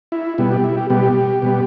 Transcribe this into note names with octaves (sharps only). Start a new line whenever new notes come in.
E4
B2 G3 B3 E4
G4
E4
G4
B2 G3 B3 G4
B2 G3 B3